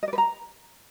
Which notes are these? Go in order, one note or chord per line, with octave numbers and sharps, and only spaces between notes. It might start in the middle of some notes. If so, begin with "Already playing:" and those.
D#5
D5
B4
A#5